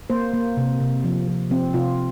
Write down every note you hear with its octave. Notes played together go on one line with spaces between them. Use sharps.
A#3 C5
A#3
C3
C3
F3
F3
F3 C4
C3 F4